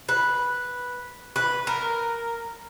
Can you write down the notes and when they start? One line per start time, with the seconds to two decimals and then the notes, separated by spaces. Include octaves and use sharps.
0.09 B4
1.36 B4
1.67 A#4